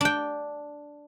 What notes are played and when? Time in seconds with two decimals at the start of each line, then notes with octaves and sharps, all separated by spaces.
0.01 D4 G5